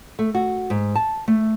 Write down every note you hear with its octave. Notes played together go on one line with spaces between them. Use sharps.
A3
F#4
G#2
A5
A3